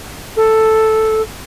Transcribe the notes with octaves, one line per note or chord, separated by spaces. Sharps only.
A4